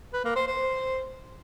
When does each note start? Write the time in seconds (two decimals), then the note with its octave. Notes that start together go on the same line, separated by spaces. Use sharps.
0.13 B4
0.25 A#3
0.36 C5
0.47 C5